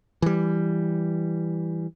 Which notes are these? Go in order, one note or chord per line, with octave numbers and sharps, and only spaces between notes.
E3 G3